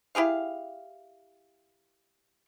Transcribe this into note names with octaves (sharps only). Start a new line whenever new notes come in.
E4 G4 G#4 F5